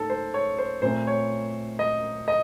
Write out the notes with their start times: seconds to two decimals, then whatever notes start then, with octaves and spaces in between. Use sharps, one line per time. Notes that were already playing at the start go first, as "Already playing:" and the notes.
Already playing: A2 A#3 D#4 A4
0.10 C5
0.34 C#5
0.58 C5
0.82 A#2 A3 C4 C5
1.07 C#5
1.79 D#5
2.28 D#5